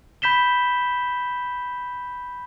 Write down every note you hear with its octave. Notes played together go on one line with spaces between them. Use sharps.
B5 G6 B6 E7 G7